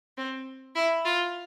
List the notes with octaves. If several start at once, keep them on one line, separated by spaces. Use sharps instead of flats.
C4
E4
F4